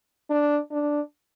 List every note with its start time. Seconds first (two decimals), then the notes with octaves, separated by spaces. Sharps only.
0.30 D4
0.72 D4